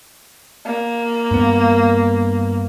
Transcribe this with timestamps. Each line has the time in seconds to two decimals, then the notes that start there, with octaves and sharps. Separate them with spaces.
0.66 A#3
1.31 G2 B3